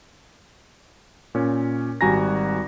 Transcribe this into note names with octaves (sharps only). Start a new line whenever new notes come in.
A#2 C#4
G#1 G3 F#4 G#5 A#5 A#6